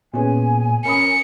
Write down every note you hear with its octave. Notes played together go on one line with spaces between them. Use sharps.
A#2 B3 C#4 G#4 G#5
C#4 A#4 B5 D#6 C#7